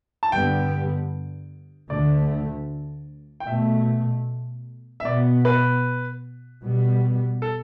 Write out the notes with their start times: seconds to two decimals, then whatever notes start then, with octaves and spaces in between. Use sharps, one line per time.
0.23 A5
0.32 G2 D3 G3 B3 G5
1.90 D2 D3 A3 D5
3.40 G5
3.47 B2 A3 E5
5.00 E5
5.05 B2 B3 D5
5.45 B4
6.62 B2 G3 B3
7.42 A4